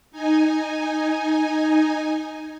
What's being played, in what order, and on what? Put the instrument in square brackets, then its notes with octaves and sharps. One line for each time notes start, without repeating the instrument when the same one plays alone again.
[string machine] D#4 G#5